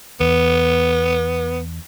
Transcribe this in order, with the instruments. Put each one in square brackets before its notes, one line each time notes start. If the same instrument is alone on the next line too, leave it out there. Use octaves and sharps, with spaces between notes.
[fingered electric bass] E2 [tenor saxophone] B3